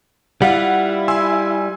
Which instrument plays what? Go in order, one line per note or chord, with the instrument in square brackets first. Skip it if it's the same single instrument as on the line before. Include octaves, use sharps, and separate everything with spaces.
[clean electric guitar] G3 F4 [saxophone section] E4 [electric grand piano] F5 F#5
[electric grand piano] G#5 C6 E6